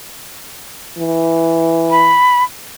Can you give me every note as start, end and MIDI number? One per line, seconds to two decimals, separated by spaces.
0.98 2.17 52
1.91 2.44 83